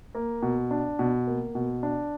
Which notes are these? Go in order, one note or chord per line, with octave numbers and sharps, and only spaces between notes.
A#3
B2
D4
B2
A#3
B2
D4